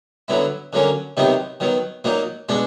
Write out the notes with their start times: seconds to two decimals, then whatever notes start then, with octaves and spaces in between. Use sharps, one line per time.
0.28 D3 F#3 B3 E4
0.73 D3 F#3 A#3 C#4
1.17 C3 D#3 F#3 B3 D#4
1.60 D#3 F#3 B3
2.04 A#2 F#3 A#3 D#4
2.49 B2 G#3 B3 D4